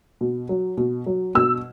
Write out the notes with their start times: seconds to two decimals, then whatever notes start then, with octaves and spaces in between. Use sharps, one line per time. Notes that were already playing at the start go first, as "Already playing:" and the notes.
0.21 B2
0.49 F#3
0.77 B2
1.06 F#3
1.35 B2 E6